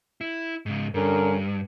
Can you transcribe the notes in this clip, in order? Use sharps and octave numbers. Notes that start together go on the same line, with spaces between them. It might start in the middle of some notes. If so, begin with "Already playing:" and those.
E4
G#2 C#3
G2 D3 C#4 A#4